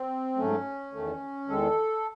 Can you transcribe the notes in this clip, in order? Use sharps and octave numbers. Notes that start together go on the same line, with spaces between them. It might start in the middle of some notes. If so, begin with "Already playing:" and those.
Already playing: C4
G#2 F#3 A3 C#4
E2 D#3 A3
E2 D#3 G#3 A4